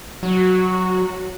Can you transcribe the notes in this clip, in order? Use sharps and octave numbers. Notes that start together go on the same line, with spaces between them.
F#3 F#4